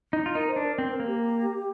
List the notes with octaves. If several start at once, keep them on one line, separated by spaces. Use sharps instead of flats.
D#4
F4
D#4 A#4
C5
D4
A#4
C4 C5
A#4
A#3
G4